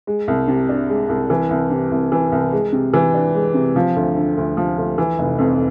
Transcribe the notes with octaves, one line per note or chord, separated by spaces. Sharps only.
G#3
C2
C3
D4
G#3
C2
E3
C2
C3
C2
E3
C2
G#3
C3
E3
D4
G#3
C3
F3
D2
D3
D2
F3
D2
E3
F1
F2